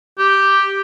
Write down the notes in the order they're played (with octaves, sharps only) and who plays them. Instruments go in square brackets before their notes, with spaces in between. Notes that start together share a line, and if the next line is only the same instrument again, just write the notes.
[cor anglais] G4